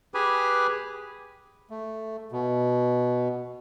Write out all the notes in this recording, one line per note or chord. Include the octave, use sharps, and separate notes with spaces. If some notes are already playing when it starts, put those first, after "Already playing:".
G4 G#4 B4 G#5
A3
B2